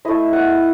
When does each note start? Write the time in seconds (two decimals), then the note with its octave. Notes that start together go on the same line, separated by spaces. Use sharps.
0.05 A3 E4 D#5
0.33 F#5